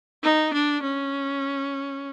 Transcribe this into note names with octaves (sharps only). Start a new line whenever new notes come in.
D#4
D4
C#4